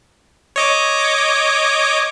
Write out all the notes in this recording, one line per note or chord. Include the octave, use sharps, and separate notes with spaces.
C#5 D#5 D6